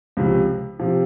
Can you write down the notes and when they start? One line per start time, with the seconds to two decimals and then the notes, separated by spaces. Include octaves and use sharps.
0.17 C#2 C3 F3
0.80 C3 F3